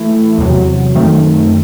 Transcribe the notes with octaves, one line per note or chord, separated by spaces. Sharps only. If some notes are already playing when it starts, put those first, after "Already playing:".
Already playing: E3 A3 E4
E2 C3 F#3
F#2 D#3 A3 C4